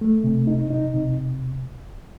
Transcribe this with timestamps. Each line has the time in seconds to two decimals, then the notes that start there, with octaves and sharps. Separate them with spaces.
0.01 A3
0.24 C3
0.47 D#4
0.70 D#4
0.94 C3